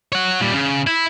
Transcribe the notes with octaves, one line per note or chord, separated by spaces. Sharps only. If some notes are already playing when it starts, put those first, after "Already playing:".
C#5 F#5
A#2 G3
C#3
E4